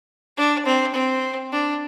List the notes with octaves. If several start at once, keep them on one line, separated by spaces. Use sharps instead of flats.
D4
C4
C4
D4